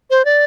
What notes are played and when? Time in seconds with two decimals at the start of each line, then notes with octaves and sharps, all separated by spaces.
0.10 C5
0.25 D5